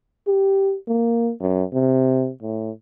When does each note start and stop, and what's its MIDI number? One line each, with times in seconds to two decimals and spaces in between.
0.27 0.76 67
0.88 1.31 58
1.41 1.63 42
1.73 2.30 48
2.42 2.71 45